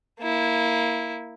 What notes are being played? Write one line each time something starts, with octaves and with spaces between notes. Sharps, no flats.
A#3 E4